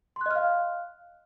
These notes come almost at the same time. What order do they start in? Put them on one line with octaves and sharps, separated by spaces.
C6 F#6 D#5 F6 F5